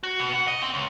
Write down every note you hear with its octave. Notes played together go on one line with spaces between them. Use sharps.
F#4
B2
F#5
D#5
C4
C#2